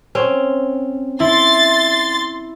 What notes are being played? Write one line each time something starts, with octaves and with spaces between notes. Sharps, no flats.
C4 C#4
E4 C6 A6